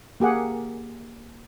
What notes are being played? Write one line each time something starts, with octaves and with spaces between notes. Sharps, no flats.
A#3 G4 G#4 F#5